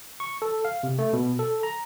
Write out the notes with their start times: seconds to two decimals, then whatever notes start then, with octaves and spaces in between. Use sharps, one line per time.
0.20 C#6
0.42 A4
0.65 F5
0.83 C3
0.99 A3
1.13 B2
1.39 A4
1.63 A#5